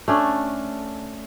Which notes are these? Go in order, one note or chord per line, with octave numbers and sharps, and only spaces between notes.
A3 C#4 D4